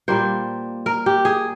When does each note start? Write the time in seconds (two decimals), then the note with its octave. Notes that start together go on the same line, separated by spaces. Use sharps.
0.08 A#2 G3 A#3 C5
0.86 A#4
1.06 G4
1.25 G#4